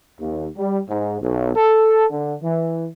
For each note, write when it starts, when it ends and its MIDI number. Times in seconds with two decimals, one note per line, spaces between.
0.19 0.47 39
0.57 0.80 55
0.89 1.20 44
1.22 1.53 35
1.56 2.06 69
2.11 2.35 50
2.42 2.87 52